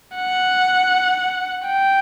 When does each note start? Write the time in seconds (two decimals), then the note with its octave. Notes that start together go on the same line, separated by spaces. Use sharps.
0.16 F#5
1.67 G5